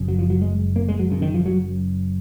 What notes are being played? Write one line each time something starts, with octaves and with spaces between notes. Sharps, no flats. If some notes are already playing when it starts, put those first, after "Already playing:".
Already playing: F#1 F#2 C#3
F#3
F3
F#3
G#3
A#3
G#3
F#3
F#1 F#2 C#3
D#3
F3
F#3